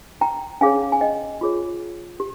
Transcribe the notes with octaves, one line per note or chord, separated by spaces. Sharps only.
G5 A#5
C#4 G#4 C#5 F5 G#5
G#5
D#5 G5
F4 G#4 C#5
G4